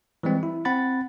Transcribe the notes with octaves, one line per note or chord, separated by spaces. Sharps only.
E3 G3 G#3 C4
E4
C4 F#5 B5 A6